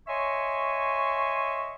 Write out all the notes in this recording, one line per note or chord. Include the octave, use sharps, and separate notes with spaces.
C#5 D#5 E5 G#5 C6 C#6